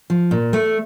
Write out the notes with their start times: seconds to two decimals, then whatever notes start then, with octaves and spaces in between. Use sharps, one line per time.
0.10 F3
0.31 A#2
0.53 A3